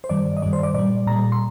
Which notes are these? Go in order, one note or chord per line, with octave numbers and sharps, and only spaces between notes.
C5
G2 D#3 G3 D5
D#5
G2 D#3 G3 D5
C5
D5
A#2 G3 D5
A#2 G3 A#5
C6